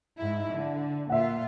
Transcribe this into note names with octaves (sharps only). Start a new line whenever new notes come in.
G#2 E4
D3
A#2 F4 E5 F#5